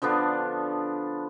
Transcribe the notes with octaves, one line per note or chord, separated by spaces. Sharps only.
D3 F3 B3 D4